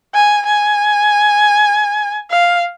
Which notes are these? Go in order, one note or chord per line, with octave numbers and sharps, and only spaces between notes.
G#5
G#5
F5